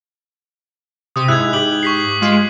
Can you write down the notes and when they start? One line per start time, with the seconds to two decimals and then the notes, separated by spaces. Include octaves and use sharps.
1.16 C3 D#6
1.28 G#2 E4 F#6 G#6
1.53 G4 F#7
1.83 C#6 B6 C7
2.21 G#3 F4